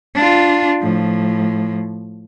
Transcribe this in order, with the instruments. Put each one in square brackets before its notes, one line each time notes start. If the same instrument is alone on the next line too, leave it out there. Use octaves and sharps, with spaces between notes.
[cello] D4 F4
A2 F3